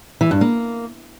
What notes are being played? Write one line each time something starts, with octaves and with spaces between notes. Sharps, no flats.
E3
G2
A#3